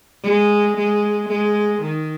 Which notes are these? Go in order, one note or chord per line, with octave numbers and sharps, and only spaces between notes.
G#3
G#3
G#3
D#3